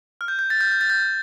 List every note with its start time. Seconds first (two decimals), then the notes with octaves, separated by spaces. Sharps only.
0.21 F6
0.28 G6
0.39 G6
0.50 A6
0.61 G6
0.71 G6
0.81 A6
0.90 G6